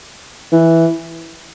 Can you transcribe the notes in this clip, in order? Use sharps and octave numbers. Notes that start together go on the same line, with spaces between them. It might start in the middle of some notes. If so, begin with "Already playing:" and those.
E3